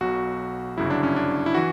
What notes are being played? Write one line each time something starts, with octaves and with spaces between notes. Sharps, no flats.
B1 B2 F#3 F#4
G1 F#2 C#3 F#3 E4
D4
C#4
D4
E4
E3 F#4